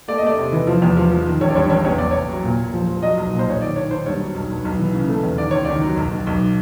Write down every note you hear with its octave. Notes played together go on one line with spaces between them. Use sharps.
A3 D5
D#5
A3 D5
C3
E3
F3
E2
F3
F3
D#3
A1 C#5
D5
G2 C#5
A1 C#5
E2 C#5
E2 D5
E2 C#5
F#3
A#2
A#2
F3
F3
F#3 D#5
B1
A#2
C5
B1 C#5
D#3 D5
D#3 C#5
D#3 C5
G2 C#5
F#3
B1
B1
B1
E3
C#3
A3
E2
D#3 D5
C#2 C#5
D#3 D5
F#3
B1
B1
B1